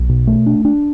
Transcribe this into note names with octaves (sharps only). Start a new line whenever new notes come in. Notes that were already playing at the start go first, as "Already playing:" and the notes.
Already playing: B1
B2
A3
D4
D4